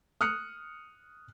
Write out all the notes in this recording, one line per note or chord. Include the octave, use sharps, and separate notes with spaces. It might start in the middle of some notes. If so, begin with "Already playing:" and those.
D#6 F6 F#6 C#7